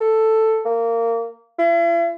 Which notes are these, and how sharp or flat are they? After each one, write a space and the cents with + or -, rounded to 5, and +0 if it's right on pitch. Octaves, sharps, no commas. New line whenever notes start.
A4 +5
A#3 -20
E4 +45